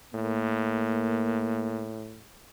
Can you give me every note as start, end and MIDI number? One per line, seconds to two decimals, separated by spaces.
0.14 2.22 45
0.14 1.92 58